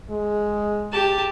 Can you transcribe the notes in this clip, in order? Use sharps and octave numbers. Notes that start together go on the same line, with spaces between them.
G#3
G4 A5